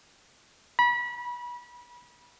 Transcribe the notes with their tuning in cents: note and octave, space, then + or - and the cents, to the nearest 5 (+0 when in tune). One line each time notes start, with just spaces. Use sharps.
B5 -30